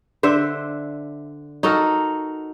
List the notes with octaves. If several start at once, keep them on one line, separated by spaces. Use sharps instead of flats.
D3 C5 E5
D#4 F#4 A4 A#4